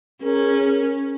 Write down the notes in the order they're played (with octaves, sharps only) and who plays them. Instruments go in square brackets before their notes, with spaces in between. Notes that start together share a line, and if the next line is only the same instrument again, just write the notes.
[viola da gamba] C#4 [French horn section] G#4 A#4